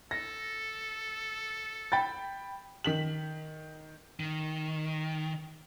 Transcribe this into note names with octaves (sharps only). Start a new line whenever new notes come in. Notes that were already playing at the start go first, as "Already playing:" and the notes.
A4 A#6
G5 B5 A6
D#3 B6 F#7
D#3